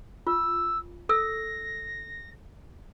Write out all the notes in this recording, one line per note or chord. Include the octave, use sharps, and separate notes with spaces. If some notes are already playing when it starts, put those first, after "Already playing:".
F4 E6
A4 E6 A#6